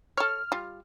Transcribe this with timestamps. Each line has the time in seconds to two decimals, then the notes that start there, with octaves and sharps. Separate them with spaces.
0.17 A4 C#5 F6
0.52 G3 F4